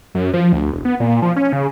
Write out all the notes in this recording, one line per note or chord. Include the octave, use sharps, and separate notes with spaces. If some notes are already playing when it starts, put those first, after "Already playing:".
F#2
F3
D2
E1
B3
A#2
F3
C#4
C#3